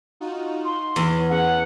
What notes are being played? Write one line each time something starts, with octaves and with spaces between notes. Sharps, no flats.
D#4 F4 F#4
C6
E2 C#5
C#4 G#4 F#5